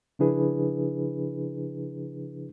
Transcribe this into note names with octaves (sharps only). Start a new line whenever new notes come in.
C#3 F3 D4 E4 G#4 B4